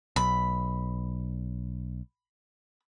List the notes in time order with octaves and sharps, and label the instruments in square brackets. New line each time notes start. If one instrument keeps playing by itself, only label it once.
[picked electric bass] B1 [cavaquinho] B5